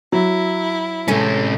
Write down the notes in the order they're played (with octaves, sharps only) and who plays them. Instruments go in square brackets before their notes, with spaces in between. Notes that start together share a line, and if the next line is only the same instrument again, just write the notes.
[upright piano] F#3 [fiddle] E4
[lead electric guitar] A2 C#4 [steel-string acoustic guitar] C3 G#3 A3